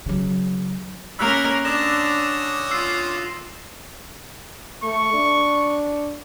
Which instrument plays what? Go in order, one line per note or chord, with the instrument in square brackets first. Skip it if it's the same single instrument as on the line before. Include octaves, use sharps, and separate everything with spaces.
[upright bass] C#3 F#3
[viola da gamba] A#3 C#4 A#4 [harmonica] C#5 B5 [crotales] E6 F#6 F7
[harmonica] D3 C#4 D#6 [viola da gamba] D4 [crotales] A#6 E7
[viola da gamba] F4 [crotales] E6 C7
[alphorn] A3 [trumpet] C#6
[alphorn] D4